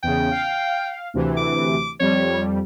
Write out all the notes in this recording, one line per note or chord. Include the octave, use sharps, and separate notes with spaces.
E2 C#3 G5
F5
D2 C3 E3
D6
F2 G3 C#5